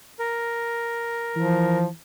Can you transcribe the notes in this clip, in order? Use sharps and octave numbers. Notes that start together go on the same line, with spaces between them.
A#4
E3 F3